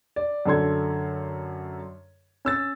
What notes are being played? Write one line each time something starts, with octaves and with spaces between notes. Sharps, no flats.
D5
F#2 D3 A4 C6 G#6
C#4 E6 A6